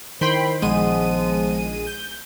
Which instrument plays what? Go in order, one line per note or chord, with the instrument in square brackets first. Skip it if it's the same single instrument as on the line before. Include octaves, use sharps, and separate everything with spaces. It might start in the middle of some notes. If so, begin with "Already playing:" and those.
[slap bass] D#3 [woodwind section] E4 A#4 C5 [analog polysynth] G5 B5 C6
[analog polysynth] A#1 G#3 D#7 [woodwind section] F3 B3
[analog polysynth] G6